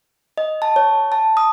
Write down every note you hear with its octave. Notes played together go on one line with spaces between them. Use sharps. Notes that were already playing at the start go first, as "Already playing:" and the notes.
D#5
A5
C#5
A5
D#6